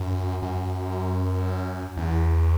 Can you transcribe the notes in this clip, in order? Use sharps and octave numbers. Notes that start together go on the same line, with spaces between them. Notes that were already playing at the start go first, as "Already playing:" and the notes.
Already playing: F#2
F#2
E2